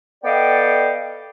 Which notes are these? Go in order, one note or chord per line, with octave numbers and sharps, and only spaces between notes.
B3 A4 D5 D#5 F5 G5